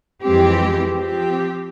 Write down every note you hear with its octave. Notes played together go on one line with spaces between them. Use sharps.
F2 E3 G#3 C4 G4
F3 C4 G4